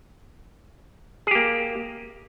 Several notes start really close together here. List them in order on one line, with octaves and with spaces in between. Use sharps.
G#4 G4 A#3